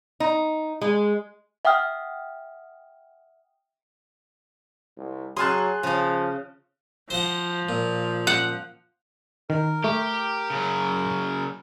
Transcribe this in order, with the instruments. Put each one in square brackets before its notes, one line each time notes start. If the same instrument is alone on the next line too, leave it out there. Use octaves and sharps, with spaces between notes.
[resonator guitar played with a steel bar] D#4
G#3
[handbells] E5 F#5 G5 D#6 F6
[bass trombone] C2
[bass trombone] F#3 [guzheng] G#4 G#5 A5 [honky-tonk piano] C6 F6 F#6
[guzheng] C#3 C#4 [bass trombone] F3
[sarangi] F3 [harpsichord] C5 F#5
[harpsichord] A#2
[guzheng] F#5
[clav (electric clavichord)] D#3 [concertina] A#4
[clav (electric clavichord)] A3 [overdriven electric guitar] G4
[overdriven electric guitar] C#3 F#3